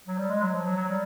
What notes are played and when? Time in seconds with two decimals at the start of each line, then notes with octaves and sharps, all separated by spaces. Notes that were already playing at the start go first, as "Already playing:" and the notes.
0.07 F#3
0.18 G3
0.30 G#3
0.42 F#3
0.53 F3
0.65 F#3
0.76 F#3
0.89 G3